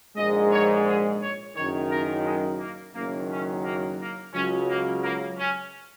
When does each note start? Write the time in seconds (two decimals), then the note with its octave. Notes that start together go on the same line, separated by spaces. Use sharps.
0.17 A#1 G#2 G#3 D#5
0.52 C#5
0.86 G#4
1.21 C#5
1.55 F#1 F#2 D#3 C#5
1.90 A#4
2.25 G#3
2.59 A#3
2.95 F#1 F#2 D#3 F#3 A#3
3.30 C#4
3.64 A#3
3.99 A#3
4.33 C#2 C#3 F#3 C#4
4.68 A#3
5.03 A#3
5.38 C#4